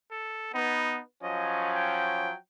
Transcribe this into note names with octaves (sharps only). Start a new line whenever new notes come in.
A4
B3 D#4
F3 F#3 C#4 D#5
G5